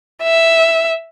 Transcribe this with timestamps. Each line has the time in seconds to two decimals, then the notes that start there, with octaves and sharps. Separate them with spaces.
0.23 E5